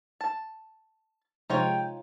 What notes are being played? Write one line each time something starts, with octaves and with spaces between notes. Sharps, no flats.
A5
C3 F3 G#3 D#4 F4 C#5 G5